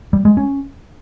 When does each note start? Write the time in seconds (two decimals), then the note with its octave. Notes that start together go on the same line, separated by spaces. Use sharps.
0.13 G3
0.25 G#3
0.37 C#4